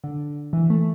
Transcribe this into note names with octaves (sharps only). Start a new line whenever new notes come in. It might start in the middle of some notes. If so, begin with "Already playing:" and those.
D3
E3
A3